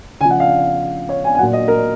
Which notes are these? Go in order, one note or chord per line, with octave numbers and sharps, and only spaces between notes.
C#3 F3 G#5
F#5
F5
C#5
G#5
G#5
A#2 F#3 F#5
D#5
A#4